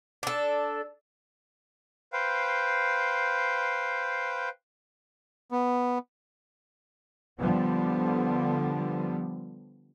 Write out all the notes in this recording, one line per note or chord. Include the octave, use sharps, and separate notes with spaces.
D4 A4
B4 C5 F5 G5
B3
D3 F3 G3 B3